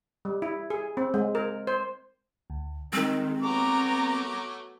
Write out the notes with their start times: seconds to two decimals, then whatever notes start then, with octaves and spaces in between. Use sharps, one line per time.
0.25 G3
0.42 E4
0.70 G#4
0.97 C4
1.14 G#3
1.35 A#4
1.67 C5
2.50 D2
2.93 D#3 G3 G#3 C4 A#4
3.42 F#3 A3 B3 A#5 D6